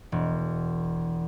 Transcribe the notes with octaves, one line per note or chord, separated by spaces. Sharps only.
E1